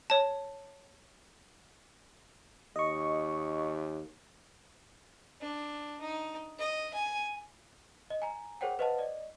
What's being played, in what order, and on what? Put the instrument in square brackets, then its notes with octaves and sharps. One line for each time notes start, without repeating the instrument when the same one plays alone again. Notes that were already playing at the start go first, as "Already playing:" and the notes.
[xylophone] C#5 A5
[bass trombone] D#2 [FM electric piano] D#5 C#6
[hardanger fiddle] D4
D#4
D#5
G#5
[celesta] D#5
G#5 A#5
G#4 A#4 C5 C#5 F#5 G5
B4 C5 D#5 F5 F#5 A5
D5 D#5